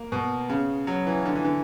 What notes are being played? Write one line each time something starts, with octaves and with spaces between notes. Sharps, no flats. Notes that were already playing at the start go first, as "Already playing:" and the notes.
Already playing: A#3
B2
C#3
F#3
E3
D3
E3
D3